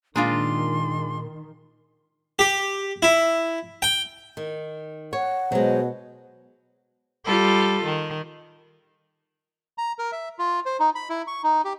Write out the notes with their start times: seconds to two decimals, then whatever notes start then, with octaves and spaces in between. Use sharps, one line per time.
0.16 A#2 D#3 G#3 A#3 D4 F4 A#5 C6
2.39 G4
3.02 E4
3.82 G5
4.37 D#3
5.13 C#5 F#5
5.52 B2 F#3 G#3 C5
7.25 G3 F4 A4
7.85 D#3
9.78 A#5
9.99 A#4
10.12 E5
10.39 F4
10.66 C5
10.80 D#4
10.95 B5
11.09 E4
11.27 C#6
11.44 D#4
11.64 G4